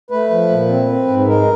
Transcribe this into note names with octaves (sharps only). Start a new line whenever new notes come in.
A3 B4
F3
A#2
C4
C4
G#2
G#3 A#4